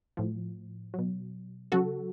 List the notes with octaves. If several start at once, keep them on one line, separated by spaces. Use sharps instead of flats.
A2 F3
B2 F#3
C#3 F#3 F#4 A4